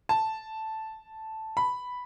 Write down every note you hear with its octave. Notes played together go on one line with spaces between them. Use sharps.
A5
B5